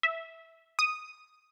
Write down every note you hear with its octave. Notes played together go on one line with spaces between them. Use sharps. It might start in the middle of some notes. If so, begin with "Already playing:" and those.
E5
D#6